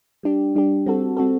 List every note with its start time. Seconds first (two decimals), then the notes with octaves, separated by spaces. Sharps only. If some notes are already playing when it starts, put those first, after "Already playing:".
0.23 G3 D4 G4
0.55 G3 D4 G4
0.86 G3 C4 F#4 A4
1.17 G3 C4 F#4 A4